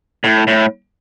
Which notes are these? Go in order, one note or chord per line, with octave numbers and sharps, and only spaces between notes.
A2
A2